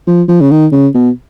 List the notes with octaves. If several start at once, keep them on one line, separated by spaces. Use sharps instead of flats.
F3
F3
C#3
D#3
C#3
B2